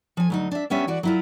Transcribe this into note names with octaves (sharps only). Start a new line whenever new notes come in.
F3 G#5
D2 F#3 D#4
D4 E5
G3 B3 C#4 D4 E5
E3 F#4 D5
F#3 E4 F4